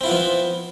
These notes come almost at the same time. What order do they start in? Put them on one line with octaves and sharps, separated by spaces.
C4 E4 F4 B3 F3